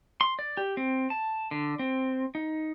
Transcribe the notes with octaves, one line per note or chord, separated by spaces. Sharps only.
C6
D5
G4
C4
A5
D3
C4
D#4